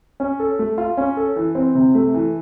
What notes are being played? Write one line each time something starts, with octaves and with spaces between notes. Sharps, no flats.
C#4
A4
A3
F4
C#4
A4
E3
C4
C3
A3
E3